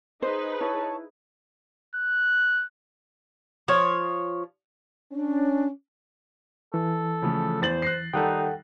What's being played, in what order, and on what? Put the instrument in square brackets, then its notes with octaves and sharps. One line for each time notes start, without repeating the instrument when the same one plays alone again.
[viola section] D#4 G#4 B4 [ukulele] C5
[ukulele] E4 [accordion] C#5 A5
[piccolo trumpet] F#6
[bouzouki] F3 C#5
[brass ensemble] C#4 [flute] D4
[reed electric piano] E3 [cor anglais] A4
[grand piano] C#3 F3 A3
[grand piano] E2 A6 F#7 [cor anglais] C5
[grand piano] F#6 A#6 C7
[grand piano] D#3 G3 [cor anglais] D#4 [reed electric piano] A4 F#5 G5